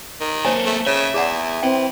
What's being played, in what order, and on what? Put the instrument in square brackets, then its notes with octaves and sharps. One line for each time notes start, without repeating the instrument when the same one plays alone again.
[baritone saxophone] D#3
[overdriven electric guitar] A#3 A4 [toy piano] C5 C#5 G#5
[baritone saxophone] A3
[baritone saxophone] C#3 [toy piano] C#5 [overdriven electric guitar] E5
[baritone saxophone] E2 [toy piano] G#4 D5 F#5
[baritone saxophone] E3 [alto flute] C4 [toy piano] G5